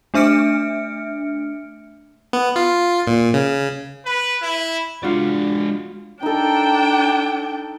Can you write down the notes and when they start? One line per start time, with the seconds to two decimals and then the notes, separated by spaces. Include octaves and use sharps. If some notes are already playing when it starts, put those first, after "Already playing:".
0.14 A3 D4 E5 F6 C#7 D7
2.33 B3
2.56 F4
3.07 A#2
3.34 C#3
4.05 B4
4.42 E4
5.03 G#3 D4 F4 F#4 D5
6.23 D4 D#4 A4 G5